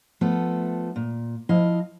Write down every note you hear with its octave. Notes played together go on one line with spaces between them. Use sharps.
F3 A3 B3 A4
A#2
F3 E4 D#5 F5